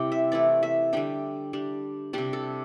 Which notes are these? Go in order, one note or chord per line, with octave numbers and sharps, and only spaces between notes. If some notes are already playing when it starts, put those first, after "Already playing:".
Already playing: C3 G3 C4 E4 D5 G5
E5
E3 A3 E4 D5
E5
D3 G3 D4 G5
G3 D4
C3 G3 D4 G4
A4